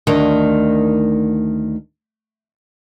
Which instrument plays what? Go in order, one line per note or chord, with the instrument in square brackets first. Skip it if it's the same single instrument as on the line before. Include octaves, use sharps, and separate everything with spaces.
[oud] D2 D#3